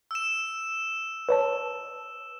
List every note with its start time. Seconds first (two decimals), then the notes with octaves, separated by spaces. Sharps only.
0.11 E6 E7
1.29 B4 C#5 A5